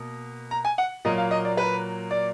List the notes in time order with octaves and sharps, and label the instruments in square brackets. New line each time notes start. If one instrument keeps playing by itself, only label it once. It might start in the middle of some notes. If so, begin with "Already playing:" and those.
Already playing: [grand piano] B2 A#3
A#5
G#5
F#5
A#2 F#3 A#3 D#5
F5
D#5
D5
B4
D5